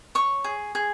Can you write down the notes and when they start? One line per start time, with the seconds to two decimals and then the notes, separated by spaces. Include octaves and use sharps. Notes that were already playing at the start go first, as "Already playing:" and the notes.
0.15 C#5 C#6
0.44 G#4
0.75 G#4